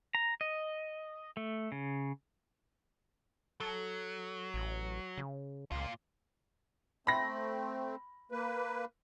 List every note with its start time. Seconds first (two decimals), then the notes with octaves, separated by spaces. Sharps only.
0.15 A#5
0.41 D#5
1.37 A3
1.72 C#3
3.60 F#3 A4
4.54 A1
5.18 C#3
5.72 C#2 A#2 F4
7.07 A3 C4 B5 A#6
8.32 A#3 B4